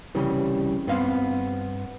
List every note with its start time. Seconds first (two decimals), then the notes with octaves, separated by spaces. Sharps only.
0.15 C2 C#3 E3 G3
0.87 G2 B3 C4 F5